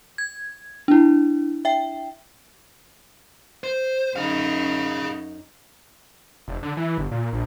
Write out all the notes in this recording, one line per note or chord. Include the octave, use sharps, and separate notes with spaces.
G#6
D4 E4
E5 G5
C5
F#2 C#4 D#4 G#4 F5
F1
D3
E3
G1
A#2
A#1